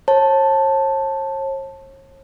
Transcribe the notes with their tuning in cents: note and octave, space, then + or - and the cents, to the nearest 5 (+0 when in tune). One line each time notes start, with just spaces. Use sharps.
C#5 -45 A5 +0